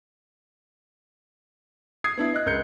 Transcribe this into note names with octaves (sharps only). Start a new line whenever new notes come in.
D#6 G#6 C7
B3 D4 E4
D#5 F#6
C#2 A#4 G6 C#7